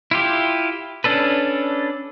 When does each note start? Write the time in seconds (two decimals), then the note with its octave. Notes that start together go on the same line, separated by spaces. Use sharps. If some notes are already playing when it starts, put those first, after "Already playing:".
0.11 E4 F4 G4
1.04 C#4 D4 A4 B4